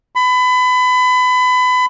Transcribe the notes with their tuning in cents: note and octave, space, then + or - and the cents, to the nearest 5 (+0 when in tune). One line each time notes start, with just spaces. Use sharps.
B5 +30